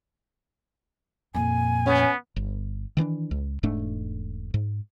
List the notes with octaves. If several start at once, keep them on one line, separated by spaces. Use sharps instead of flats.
F2 A#2 G#5
B3 C#4
G1
D#3 E3 B3 D4
C#2
E1 G#2 A3 D4
G#2